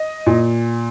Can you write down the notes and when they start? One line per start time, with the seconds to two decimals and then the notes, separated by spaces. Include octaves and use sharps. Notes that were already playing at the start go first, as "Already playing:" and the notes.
Already playing: D#5
0.26 A#2